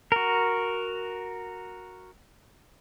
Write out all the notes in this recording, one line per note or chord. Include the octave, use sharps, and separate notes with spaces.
F#4 A#4